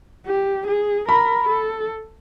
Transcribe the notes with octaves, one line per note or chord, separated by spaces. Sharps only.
G4
G#4
A#4 B5
A4